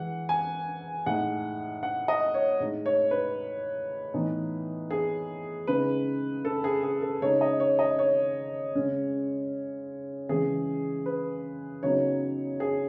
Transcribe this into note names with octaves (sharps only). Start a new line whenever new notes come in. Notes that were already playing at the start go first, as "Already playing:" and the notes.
Already playing: E3 G#3 F#5
G#5
A2 G#3 D#4 F#5
F#5
D#5
C#5
A2 G#3 D#4
C#5
B4
A2 E3 B3 D#4
G#4
C#3 G#3 D#4 B4
A4
G#4
G#4
A4
C#3 G#3 D#4 C#5
D#5
C#5
D#5
C#5
C#3 G#3 C#4
C#3 E3 G#3 G#4
B4
C#3 F#3 B3 D#4 C#5
G#4